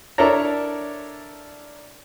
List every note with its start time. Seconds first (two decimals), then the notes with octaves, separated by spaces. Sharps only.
0.18 D4 E4 A4 A#4 C#5 A#5